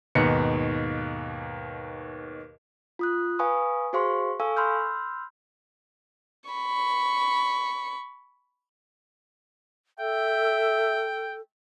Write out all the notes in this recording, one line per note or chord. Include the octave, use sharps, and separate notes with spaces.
D#2 G#2 B2 C#7
F4 D#6 F#6
B4 F5 G#5 B5 C#6 D#6
F#4 G#4 C5 F5 C6 C#6
A4 F5 G#5 C#6 E6
B5 C6 E6 F6 G6
B5 C#6
A4 E5 G5